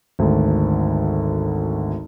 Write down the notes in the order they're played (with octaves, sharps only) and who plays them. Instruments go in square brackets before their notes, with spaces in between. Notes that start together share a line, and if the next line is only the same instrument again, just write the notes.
[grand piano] G#1 D2